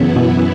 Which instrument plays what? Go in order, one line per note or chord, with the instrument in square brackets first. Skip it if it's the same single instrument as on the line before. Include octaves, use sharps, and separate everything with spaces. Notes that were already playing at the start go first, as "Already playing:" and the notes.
Already playing: [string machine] F#2 E3 B3 E4 [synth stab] C#3
[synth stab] B2